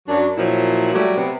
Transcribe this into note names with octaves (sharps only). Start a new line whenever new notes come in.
F#2 F#3 D4
A#2 F3 F#3 E4
F#3 G3 A3
C3 B3